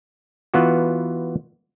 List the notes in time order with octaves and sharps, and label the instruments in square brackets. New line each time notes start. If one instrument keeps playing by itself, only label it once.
[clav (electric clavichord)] E3 B3 F4 F#4